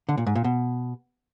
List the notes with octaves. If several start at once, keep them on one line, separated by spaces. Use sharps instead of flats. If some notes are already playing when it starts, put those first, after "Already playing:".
D3
A#2
G#2
A#2
B2